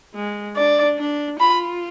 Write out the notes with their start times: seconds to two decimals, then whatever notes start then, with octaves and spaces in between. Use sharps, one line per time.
0.15 G#3
0.56 D4 D5
0.99 D4
1.40 F4 B5